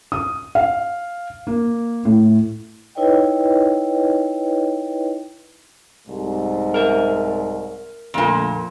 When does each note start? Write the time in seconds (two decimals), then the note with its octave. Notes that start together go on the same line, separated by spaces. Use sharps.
0.12 D#6
0.55 F5
1.47 A#3
2.05 A2
2.95 D#4 E4 B4 C#5 D#5 G5
6.07 C2 G#2
6.74 A#4 E5
8.14 F2 A#2 D3 A3 A#3